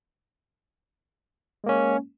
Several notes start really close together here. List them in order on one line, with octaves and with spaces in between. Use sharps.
G#3 A#3 C#4